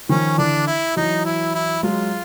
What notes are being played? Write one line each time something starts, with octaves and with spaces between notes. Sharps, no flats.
D#3 F3 C#4
D3 E3 D4
E4
E3 F#3 D#4
E4
E4
F#3 G#3 F4